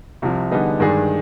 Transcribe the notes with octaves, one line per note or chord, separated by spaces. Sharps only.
C2 C3 F3
D3 G3 B3 D#4 G#4
G2 D#3 G#3 D4 G#4